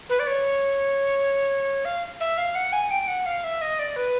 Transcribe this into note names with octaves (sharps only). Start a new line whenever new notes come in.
B4
D5
C#5
F5
E5
F5
F#5
G#5
G5
F#5
F5
E5
D#5
D5
B4